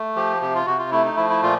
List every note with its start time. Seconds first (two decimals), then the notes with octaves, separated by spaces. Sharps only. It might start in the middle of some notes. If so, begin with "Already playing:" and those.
Already playing: A3
0.16 F3 G4
0.41 C3 G4
0.55 F4
0.66 C3 F#4
0.79 F4
0.91 A3 E4
1.05 D#4
1.17 F3 E4
1.30 E4
1.42 A#2 F4